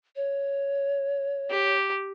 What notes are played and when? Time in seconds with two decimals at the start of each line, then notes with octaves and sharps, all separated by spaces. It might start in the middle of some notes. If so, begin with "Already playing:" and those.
0.16 C#5
1.50 G4